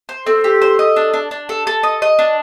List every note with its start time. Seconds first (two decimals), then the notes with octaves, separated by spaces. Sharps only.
0.09 C5
0.26 C4 A4
0.44 G4
0.61 C5
0.79 D#5
0.96 D4
1.14 D4
1.31 D4
1.49 A4
1.67 A4
1.83 D#5
2.02 D#5
2.19 D4